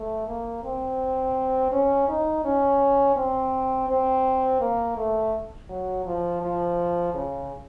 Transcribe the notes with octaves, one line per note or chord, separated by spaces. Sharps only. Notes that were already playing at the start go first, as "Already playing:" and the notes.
Already playing: A3
A#3
C4
C#4
D#4
C#4
C4
C4
A#3
A3
F#3
F3
F3
C#3